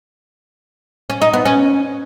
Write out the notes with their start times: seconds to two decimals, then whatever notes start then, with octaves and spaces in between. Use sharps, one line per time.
1.10 C#4
1.22 D#4
1.34 B3
1.45 C#4